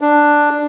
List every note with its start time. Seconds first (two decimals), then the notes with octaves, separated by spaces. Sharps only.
0.01 D4